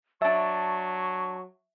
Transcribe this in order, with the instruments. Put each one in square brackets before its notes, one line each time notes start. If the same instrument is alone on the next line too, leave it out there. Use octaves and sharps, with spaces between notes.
[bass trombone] F#3 [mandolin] D4 A5 [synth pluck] E5 [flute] C#6